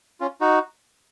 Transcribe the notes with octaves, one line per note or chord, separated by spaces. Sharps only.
C#4 F4
D#4 F#4